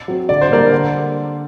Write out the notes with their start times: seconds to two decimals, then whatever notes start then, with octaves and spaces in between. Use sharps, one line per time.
0.08 F#3 C4
0.29 D3 D5
0.41 C5
0.51 G3 A#3 D4 A#4 D5
0.72 D3